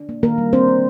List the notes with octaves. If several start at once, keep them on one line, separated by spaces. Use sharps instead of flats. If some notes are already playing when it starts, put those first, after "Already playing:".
Already playing: D4
A#3
D#3 A#3 A#4
G3
C4 D4 C5
A#3